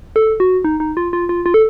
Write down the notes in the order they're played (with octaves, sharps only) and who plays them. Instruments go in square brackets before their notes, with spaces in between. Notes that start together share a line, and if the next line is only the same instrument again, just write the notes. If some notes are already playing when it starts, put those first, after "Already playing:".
[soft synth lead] A4
F#4
D#4
D#4
F4
F4
F4
F4
A4